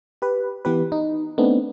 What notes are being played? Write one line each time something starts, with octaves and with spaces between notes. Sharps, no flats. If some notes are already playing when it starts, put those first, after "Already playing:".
G4 B4
E3 B3 G4 B4
D#4
A3 B3 C4 D4 D#4